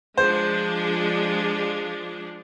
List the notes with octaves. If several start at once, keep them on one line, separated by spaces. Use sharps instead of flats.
F3 G#3 D4 C5